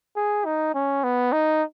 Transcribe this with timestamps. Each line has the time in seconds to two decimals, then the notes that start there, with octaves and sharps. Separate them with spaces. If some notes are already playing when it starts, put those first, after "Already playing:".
0.17 G#4
0.46 D#4
0.74 C#4
1.04 B3
1.33 D#4